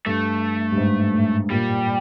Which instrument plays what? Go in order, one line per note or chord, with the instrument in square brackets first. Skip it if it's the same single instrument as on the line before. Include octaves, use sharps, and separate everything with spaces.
[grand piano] G2 [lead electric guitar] A3
[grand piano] G2
G#2
A2
[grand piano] A#2 [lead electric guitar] G3